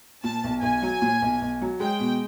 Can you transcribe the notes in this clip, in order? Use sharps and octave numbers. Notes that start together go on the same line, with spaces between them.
A#2 A5
B1
B1 G#5
F#3
A#2
B1
B1
F#3
G#3 G5
B2